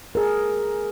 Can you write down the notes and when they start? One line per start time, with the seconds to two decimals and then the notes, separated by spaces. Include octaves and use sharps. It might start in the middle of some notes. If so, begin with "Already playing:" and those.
0.15 G#4 A#4